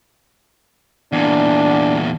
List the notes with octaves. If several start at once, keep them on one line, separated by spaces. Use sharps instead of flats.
E2 A#2 D4